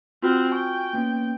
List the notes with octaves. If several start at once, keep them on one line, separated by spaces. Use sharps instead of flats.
C4 F4 F#4 F#5 F6
G5 G#5 C#6
A#3 B3 C#4